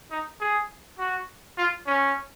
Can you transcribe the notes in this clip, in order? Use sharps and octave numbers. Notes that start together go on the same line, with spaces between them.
D#4
G#4
F#4
F4
C#4